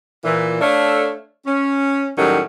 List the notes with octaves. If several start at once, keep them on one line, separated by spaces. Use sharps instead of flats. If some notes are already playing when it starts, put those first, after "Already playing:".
A#2 E3
A3 D4 A4 C#5 F5
C#4
A2 D#3 F#3 G3 C#4